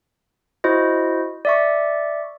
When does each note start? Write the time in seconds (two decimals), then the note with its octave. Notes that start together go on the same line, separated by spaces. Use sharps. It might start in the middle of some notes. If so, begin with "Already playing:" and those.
0.64 E4 F#4 C5 D#5
1.45 D5 E5 C#6